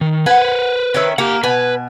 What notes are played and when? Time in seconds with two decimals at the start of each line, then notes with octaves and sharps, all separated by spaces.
0.01 D#3
0.26 B4 C5 F#5 G#5
0.94 D#3 C#4 E5
1.18 A#3 G4 F#5
1.43 B2 B4 G#5